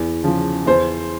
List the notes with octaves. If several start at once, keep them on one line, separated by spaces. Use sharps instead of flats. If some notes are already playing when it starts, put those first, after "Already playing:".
Already playing: E2
C#3 F3
E2 C5